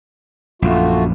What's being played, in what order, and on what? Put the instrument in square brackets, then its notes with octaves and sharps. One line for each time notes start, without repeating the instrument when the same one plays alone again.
[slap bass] A#1 F#2 [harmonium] A3 F4 F#4